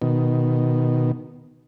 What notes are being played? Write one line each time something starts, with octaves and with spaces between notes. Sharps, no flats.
B2 D#3